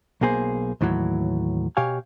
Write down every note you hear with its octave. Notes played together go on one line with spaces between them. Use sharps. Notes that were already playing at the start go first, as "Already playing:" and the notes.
B1 B2 A#3 G#4 C5
D#2 A2 E3 F#3
B2 G4 C#5 F5 G#5